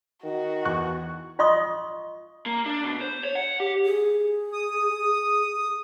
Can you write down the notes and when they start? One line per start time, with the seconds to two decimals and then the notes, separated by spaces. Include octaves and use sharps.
0.24 D#3 F#4
0.65 E2 C#6 F#6
1.39 F4 D#5 F5 C6 C#6 D#6
2.46 A#3
2.66 D4
2.84 B2
3.01 C5
3.24 C#5
3.35 F#5
3.60 G4
3.85 G#4
4.53 D#6